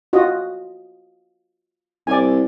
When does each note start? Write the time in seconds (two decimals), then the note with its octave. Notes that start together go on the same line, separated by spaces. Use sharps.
0.13 F4 F#4 D#5
2.07 C2 D5 G#5